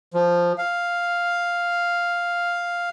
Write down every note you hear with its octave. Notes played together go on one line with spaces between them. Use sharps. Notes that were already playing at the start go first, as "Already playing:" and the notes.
F3
F5